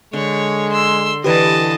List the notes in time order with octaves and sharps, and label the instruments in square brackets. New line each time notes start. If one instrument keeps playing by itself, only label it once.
[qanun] D3 [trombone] G#3 [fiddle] C#5
[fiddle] C6 E6
[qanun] D3 E3 [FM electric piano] G4 B4 D5 [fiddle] D#5 A5